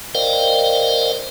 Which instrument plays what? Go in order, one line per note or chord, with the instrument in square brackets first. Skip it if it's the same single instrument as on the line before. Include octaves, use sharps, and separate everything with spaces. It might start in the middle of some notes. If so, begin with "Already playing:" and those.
[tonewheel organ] A#4 C5 D5 D#5 F5 G5